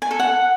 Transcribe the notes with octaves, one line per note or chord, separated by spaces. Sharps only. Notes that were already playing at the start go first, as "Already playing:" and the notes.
G#5
A4
F#5